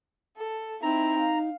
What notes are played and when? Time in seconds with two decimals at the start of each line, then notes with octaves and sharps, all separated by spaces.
0.37 A4
0.82 C4 D#4 E4 A#5
1.20 F5